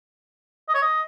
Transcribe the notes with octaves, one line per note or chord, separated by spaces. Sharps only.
D#5
C#5
D#5